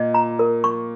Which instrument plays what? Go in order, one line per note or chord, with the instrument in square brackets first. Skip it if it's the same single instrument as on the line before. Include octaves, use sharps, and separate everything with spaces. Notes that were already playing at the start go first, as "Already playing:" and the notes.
Already playing: [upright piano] A#2 [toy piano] D#5
[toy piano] A#5
A#4
C#6